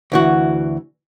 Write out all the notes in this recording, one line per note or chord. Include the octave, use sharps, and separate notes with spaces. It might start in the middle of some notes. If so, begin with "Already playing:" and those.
D2 E3 F#4